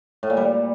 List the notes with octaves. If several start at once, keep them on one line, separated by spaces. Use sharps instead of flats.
A2
A#2
G3